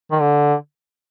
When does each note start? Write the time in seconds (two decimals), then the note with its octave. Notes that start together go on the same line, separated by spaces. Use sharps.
0.11 D#3
0.21 D3